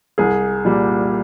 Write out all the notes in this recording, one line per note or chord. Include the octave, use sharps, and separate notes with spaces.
C2 G#4
A#2 G3